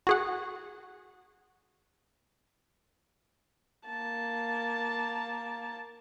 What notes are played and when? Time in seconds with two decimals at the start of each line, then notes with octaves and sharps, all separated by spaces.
0.07 F#4 G#4 F#5
3.87 A#3 A5